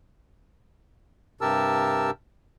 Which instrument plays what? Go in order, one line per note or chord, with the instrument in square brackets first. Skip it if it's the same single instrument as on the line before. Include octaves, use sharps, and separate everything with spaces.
[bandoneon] G2 C3 G4 A#4 A5 E6